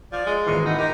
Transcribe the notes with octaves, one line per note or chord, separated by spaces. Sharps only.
F3 D5
G#3
G#1 A#2 E3 D#5 F5 C#6
D#4 E4 F#5
D#4 G4 A#4